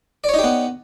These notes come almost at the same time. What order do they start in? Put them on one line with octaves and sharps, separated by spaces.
D5 C#5 D#4 G4 B3